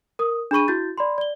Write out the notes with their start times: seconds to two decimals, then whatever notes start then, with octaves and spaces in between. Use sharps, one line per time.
0.19 A#4 D#6
0.51 D4 G#4 B5 C#6 D#7
0.68 E4 F#4 G6 A6
0.98 D5 B5 C6
1.18 D5 G7